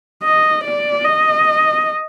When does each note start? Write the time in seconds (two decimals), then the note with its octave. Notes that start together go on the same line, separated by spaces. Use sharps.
0.23 D#5
0.64 D5
1.04 D#5